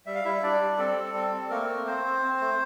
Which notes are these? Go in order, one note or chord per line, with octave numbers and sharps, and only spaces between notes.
G3 E5
F5
G3 E4 E5
G3 D4 D5
G3
C4 A4
G3
C4
C4
A3 A#3 A#4
A3
C4 C5
C4
C4
A3